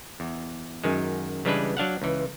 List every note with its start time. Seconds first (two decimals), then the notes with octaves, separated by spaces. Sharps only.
0.20 E2
0.84 F#2 D#3 G#3
1.45 C#3 E3 G3 G#3 D4 B4
1.77 F#3 D4 F5 F#5
2.02 C#2 E3